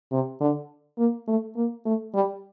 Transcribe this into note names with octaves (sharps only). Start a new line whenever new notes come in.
C3
D3
A#3
A3
A#3
A3
G3